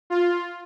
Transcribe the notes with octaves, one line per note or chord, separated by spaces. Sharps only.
F4